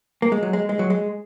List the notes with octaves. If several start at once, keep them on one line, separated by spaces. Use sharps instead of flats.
A#3
G#3
F#3
G#3
G#3
F#3
G#3